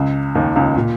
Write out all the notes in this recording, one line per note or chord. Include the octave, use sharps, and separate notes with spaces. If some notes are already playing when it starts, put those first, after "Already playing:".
Already playing: C#2 C#3
D#2 D#3
C#2 C#3
A#2